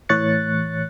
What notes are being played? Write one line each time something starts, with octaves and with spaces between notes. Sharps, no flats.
A2 E3 C#5 F#6 A6 C#7